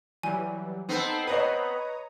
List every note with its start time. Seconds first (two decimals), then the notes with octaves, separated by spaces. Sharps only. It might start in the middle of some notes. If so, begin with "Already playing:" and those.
0.23 E3 F#3 G3 G#5
0.89 B3 C4 D#4 A4
1.27 B4 C#5 D#5 A#5 D#6